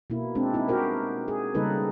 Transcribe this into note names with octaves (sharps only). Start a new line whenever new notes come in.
B2 A#3 E4
G#3 C4 D4
C4 D#4 E4
F#4 G4 A#4 C5
G#4
C#3 G3 A#3 D#4 A4 B4